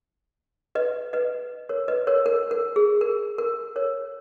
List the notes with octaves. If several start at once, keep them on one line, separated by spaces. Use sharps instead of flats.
B4 D#5
B4 D#5
A#4 C#5
B4 D#5
A#4 C#5
A#4
A#4
G#4
A#4
A#4
A#4 C#5